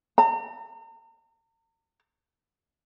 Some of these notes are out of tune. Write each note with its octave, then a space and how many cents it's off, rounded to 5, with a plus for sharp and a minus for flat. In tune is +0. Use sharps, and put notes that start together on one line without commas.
A#5 -40